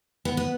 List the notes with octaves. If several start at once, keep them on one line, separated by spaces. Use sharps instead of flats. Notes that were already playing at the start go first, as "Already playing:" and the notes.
B3
B3